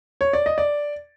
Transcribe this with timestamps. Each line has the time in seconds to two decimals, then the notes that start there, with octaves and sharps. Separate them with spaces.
0.21 C#5
0.33 D5
0.46 D#5
0.58 D5